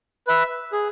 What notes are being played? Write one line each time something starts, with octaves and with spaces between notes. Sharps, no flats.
B4 E5
G#4